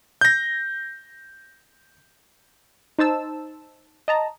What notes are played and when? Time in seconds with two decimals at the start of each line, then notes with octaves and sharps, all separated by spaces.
0.21 G6 A#6
2.99 D#4 C5 A5 E6
4.08 D#5 A5 A#5